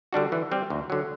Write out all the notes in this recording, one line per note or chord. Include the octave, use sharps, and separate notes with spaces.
D3 G3 D4 F#4
E3
G3 C4
D2
D3 F#3